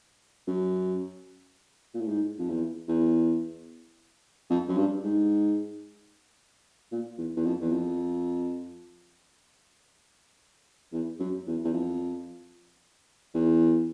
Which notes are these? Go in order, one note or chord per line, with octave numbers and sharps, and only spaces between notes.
F#2
A#2
A2
G#2
F2
E2
E2
F2
F#2
G2
G#2
A#2
E2
E2
F2
E2
F2
E2
F#2
E2
E2
F2
E2